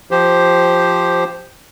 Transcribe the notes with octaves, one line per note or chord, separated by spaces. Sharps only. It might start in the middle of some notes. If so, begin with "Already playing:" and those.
F3 G4 C5